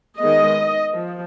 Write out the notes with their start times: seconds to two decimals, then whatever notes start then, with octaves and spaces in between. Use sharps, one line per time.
0.18 D#3 G#3 B3 D#5
0.96 F3